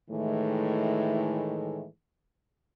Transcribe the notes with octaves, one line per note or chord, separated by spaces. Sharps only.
A2 D#3 E3 G#3 A3